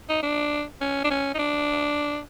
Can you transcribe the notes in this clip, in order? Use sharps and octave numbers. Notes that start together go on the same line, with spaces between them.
D#4
D4
C#4
D4
C#4
D#4
D4